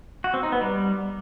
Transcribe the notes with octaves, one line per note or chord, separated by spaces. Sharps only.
F#4
C4
D#4
B3
G3